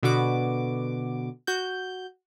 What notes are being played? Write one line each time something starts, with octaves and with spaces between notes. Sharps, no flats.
B2 D3 B3 F#4 D6
F#4 G6